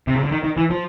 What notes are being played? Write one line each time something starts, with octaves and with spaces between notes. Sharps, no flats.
C3
C#3
D3
D#3
D#3
E3
F3